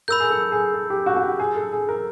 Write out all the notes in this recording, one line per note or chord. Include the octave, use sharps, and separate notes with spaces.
A#4 B5 E6 G6
G#4
A4
G#4
A4
G4
F#4
F#4
G4
G#4
A4
G#4
A#4